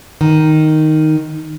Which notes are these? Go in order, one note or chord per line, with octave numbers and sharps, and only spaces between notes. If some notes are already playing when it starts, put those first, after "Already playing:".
D#3